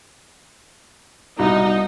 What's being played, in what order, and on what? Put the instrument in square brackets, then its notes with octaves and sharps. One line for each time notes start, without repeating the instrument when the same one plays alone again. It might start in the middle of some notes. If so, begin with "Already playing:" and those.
[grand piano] C2 B2 [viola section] D#4